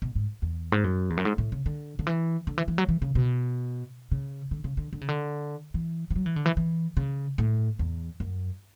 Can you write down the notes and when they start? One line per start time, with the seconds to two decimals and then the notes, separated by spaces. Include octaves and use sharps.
0.02 B2
0.15 G#2
0.42 E2
0.72 G#2
0.84 F#2
1.10 E2
1.17 F#2
1.25 G#2
1.38 A2
1.52 C#3
1.66 D3
1.99 D3
2.07 E3
2.47 D3
2.58 E3
2.68 E3
2.78 F#3
2.89 E3
3.02 C#3
3.15 B2
4.11 C#3
4.51 D3
4.64 C#3
4.77 D3
4.93 D3
5.01 C#3
5.09 D3
5.74 E3
6.11 E3
6.16 F#3
6.26 E3
6.36 D3
6.46 E3
6.57 E3
6.97 C#3
7.38 A2
7.79 E2
8.20 F#2